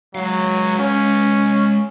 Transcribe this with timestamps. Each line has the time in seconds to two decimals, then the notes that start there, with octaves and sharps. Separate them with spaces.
0.15 F#3 G#3 F5
0.79 C#4